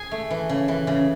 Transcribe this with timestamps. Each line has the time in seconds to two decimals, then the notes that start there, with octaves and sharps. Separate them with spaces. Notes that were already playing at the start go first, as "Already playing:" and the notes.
Already playing: G#4 G#5
0.11 A3
0.31 E3
0.49 C#3
0.68 E3
0.87 C#3